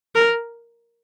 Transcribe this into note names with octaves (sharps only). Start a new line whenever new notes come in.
A#4